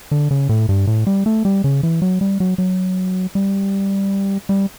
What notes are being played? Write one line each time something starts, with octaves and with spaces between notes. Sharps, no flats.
D3
C#3
A2
G2
A2
G3
A3
G3
C#3
E3
F#3
G3
F#3
F#3
G3
G3